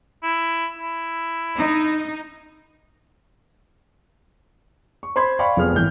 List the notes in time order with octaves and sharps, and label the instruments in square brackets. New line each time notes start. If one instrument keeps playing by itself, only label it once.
[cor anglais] E4
E4
[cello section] D#4
[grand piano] C#6
C5 B5 C6 G#6
D5 F5 G5 B5 C#6
F1 F3 B3 G#4 F6
G#1 E3 G6